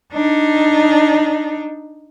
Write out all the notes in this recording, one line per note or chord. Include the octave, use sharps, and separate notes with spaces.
D4 D#4